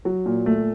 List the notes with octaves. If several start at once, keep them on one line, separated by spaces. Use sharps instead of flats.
F#3
A#2
A3